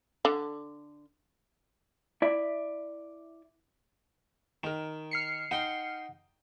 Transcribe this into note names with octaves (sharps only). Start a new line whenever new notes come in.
D3
E4 D5 E5
D#3 A#4 A#5
F6 C7 C#7
D#4 F#5 G5 C6